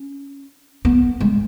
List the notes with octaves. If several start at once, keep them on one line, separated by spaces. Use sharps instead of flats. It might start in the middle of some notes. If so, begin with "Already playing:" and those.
Already playing: C#4
B3
G#3